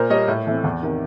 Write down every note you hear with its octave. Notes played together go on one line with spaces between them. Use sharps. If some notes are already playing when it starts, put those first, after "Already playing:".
Already playing: A#2 A#4 C5
G3 A#3 C#5 D#5
A2
E3 A3 C4
E2
C3 D#3